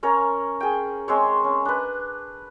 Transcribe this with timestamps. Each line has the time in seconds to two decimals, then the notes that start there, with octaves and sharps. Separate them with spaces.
0.03 C#4 A#4 C#5 A#5
0.60 G#4 G5
1.08 G#3 C4 C#5
1.44 C#4
1.65 D4 B4